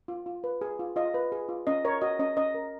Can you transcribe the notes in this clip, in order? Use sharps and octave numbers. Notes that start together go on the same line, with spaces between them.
F4
F4
B4
G#4
F4
F4 D#5
B4
G#4
F4
C#4 D#5
A#4 C#5
F#4 D#5
C#4 D#5
C#4 D#5
A#4